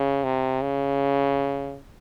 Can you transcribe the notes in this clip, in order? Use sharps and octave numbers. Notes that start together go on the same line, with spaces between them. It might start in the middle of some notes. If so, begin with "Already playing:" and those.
Already playing: C#3
C3
C#3